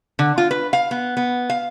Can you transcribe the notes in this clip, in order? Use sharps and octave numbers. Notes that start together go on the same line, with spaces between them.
D3
F4
B4
F5
B3
B3
F5